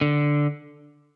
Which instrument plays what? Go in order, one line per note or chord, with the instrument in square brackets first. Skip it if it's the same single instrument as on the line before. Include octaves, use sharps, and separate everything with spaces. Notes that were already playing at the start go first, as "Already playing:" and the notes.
[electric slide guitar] D3